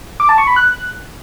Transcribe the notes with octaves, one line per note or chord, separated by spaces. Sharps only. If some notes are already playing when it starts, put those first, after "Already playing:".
D6
A5
C#6
B5
F#6